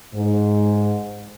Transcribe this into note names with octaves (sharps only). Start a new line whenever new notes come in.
G#2